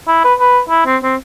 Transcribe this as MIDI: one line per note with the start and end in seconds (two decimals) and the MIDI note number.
0.07 0.23 64
0.24 0.34 71
0.39 0.60 71
0.69 0.82 64
0.86 0.97 60
1.03 1.15 60